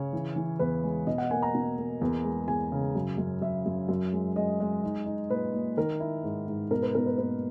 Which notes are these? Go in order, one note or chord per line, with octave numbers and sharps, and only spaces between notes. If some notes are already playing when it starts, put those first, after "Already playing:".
Already playing: C#3 C#5
E3
E3
E2 B4
G#3
B2 D#5
F#5
A#3 G#5
A#5
B2
A#3
E2
G#3
E2 G#5
C#3
F#2
F#2
F#2 E5
F#2
F#2
G#3
G#3 D#5
G#3
D#4
D#4
A#2 B4
A#2
D#3 A#4
E4
G#2
G#2
B2 A#4
B4
B2 A#4
B4
A#3 B4